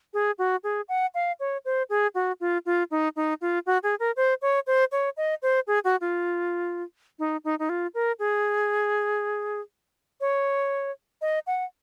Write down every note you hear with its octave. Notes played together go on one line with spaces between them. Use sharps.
G#4
F#4
G#4
F#5
F5
C#5
C5
G#4
F#4
F4
F4
D#4
D#4
F4
F#4
G#4
A#4
C5
C#5
C5
C#5
D#5
C5
G#4
F#4
F4
D#4
D#4
D#4
F4
A#4
G#4
C#5
D#5
F#5